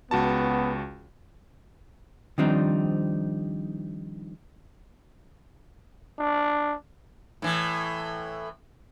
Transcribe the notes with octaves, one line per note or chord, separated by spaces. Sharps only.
C#2 B3 F#4 A5
D#3 F3 G3 C4 D4 D#4
D4
A2 E3